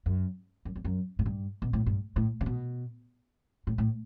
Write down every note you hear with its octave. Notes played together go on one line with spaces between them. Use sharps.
F#2
F#2
E2
F#2
A2
G2
B2
A2
G2
A2
C#3
B2
A2
A2